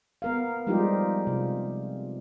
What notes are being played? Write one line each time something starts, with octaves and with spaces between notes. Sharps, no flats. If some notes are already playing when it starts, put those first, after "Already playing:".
B3 A#4 F5
F3 G3 G#3 D#4 F4 G4
C3